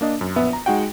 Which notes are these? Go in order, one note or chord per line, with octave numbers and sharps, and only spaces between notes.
A#3 D4 D#5
F#2
A#1 B3 E5
A#5
G#3 D#4 F#4 F#5 G5